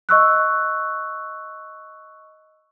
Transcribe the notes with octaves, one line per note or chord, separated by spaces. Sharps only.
D#5 C#6 E6 F#6